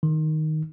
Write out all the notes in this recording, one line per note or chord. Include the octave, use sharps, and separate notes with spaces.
D#3